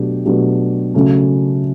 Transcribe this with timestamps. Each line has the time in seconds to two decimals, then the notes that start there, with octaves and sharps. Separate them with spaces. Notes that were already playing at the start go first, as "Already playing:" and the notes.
Already playing: B2 F#3 A3 D4 G4
0.25 B2 F#3 A3 D4 G4
0.94 C#3 F#3 A3 C#4